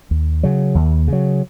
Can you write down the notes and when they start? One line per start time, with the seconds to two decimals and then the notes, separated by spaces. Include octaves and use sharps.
0.11 D#2
0.43 C#3 F#3
0.75 D#2
1.08 C#3 F#3